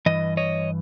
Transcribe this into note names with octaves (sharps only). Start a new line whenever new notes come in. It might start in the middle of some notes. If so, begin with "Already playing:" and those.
G2 E3 D#5
C#5 D#5